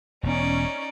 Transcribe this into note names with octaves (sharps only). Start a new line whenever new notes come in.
E1 B3 C#4 D#4 D5